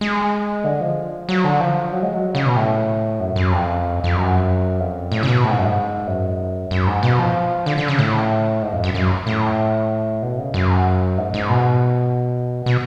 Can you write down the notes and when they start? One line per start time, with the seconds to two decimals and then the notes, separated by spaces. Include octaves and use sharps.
0.01 G#3
0.64 D3
0.81 F3
1.29 F#3
1.44 D3
1.61 F3
1.92 F#3
2.03 G#3
2.14 F#3
2.35 C#3
2.46 B2
2.56 A2
3.20 F#2
3.36 F#2
3.52 F2
4.04 F2
4.16 F#2
4.80 F2
5.12 A2
5.23 C#3
5.28 B2
5.44 A2
5.50 G#2
5.58 F#2
5.65 G#2
6.07 F#2
6.71 F#2
6.87 G#2
7.03 B2
7.19 F3
7.66 D3
7.78 D3
7.88 C#3
7.99 A2
8.62 G#2
8.73 F2
8.84 F#2
8.95 F#2
9.27 A2
10.22 B2
10.38 C#3
10.54 F#2
11.18 G#2
11.34 G#2
11.49 B2
12.66 B2